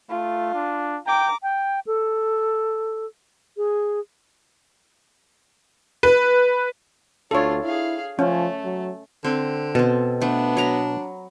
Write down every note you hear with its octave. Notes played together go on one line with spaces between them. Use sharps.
A3 F4
D4
G5 A#5 D6
G5
A4
G#4
B4
D2 D4 F4 A4 C#5
E4 G#4 F5
F3 A3 C#4
F#3
D3 C4
B2 C4 A4
A3 B3 D4
F#3 A#5 B5